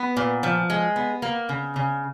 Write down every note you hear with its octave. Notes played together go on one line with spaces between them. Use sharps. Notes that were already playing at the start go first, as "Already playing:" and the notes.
Already playing: B3 B4
A#2
F3
G#3
B3
A#3
C#3
C#3